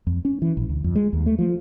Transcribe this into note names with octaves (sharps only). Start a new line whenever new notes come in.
F2
C#4
E3
A#1
D2
F2
G#3
D#2
A3
F3